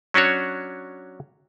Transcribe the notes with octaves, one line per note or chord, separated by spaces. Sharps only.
F#3 C#4 D4 F#4 C#5